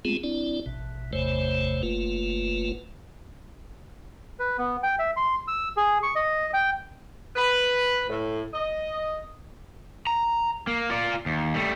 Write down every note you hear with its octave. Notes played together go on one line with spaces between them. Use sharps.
G#3 A3 B3 C4 F4 G#4
C4 D4 E4 D5
A1 B2
G#1 E2 C3 A3 C5 C#5
F#1 A3 A#3 F4 B4
B4
B3
G5
E5
C6
E6
G#4
C#6
D#5
G5
B4
A2
D#5
A#5
A#3
F4 D5
D#2
G3 A3